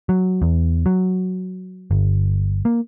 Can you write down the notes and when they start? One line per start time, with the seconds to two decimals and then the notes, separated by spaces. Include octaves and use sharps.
0.09 F#3
0.42 E2
0.86 F#3
1.91 G1
2.65 A#3